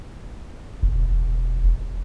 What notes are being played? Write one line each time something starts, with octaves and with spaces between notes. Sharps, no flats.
E1